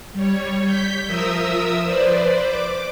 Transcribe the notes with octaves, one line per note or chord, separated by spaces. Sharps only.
G3 C#5
G6 B6
F3 A#4 E5 D#6 E6
B4 C5 D5
D6